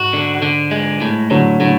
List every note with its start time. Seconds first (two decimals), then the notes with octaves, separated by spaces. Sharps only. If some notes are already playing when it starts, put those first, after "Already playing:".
Already playing: G#2 F#4
0.13 D3
0.42 D3
0.71 G#3
1.01 A2
1.30 A2 D3 F#3
1.60 A2 D3 F#3